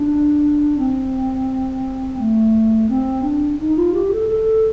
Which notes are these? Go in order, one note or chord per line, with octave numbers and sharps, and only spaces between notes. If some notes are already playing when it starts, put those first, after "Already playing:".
Already playing: D4
C4
A3
C4
D4
D#4
F4
G4
A4
A4